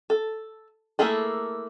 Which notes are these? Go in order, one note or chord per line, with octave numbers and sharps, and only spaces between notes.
A4
A3 A#3 E4 G#4 A4